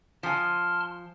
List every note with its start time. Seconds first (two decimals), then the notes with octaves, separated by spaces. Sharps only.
0.23 F3 G#5 A5 C6 F6